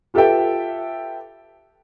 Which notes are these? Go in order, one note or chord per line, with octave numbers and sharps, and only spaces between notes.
F4 G4 A4 B4 E5 G5